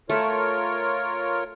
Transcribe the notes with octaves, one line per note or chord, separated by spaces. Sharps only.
A3 F4 A#4 C#5